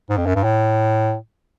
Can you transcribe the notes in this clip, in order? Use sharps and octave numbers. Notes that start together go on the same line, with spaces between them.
G#2
F2
F#2
G2
A2